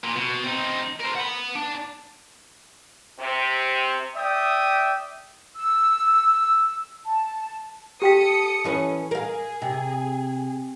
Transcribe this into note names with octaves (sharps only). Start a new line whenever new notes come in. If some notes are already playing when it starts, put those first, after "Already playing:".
A#2
B2
C4 D#4
A#4 C5
F#5 B5
D4
C3
D5 E5 G5 D#6
E6
A5
G4 A4 G5 D#6 B6 C#7
E3 C#4 B4
G#4 A#4 F5
C3